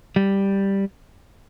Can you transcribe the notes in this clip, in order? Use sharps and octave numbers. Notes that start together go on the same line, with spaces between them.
G3